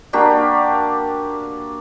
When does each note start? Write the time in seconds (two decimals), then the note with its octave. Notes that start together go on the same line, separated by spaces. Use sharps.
0.13 A#3 D4 F#4 G4